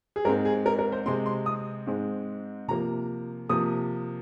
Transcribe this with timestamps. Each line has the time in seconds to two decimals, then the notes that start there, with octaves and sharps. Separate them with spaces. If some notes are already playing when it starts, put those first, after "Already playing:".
0.16 G#4
0.25 G#2 G#3 C4 A#4
0.45 G#4
0.66 A#4
0.79 A#4
0.92 C5
1.06 C3 G#3 C4 C6
1.26 C6
1.46 D#6
1.87 G#2 G#3 C4
2.68 C3 F3 A#3 A#5
3.49 C3 F3 A#3 D#6